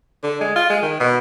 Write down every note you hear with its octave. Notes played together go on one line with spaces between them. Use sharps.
D3
G#3
F4
G#3
D#3
B2